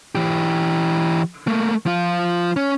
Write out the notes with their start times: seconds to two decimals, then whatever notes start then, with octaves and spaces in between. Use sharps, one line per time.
0.15 E3 G4
1.47 A3 A#3
1.86 F3 F4
2.56 C#4